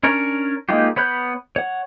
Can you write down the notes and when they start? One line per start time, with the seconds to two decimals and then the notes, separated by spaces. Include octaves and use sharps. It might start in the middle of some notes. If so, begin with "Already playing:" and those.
0.03 C#4 D4 A#4 C#5
0.69 G#3 A#3 D#4 F4 G4
0.96 B3 C#5 B5 F#6 G6
1.56 C#5 F#5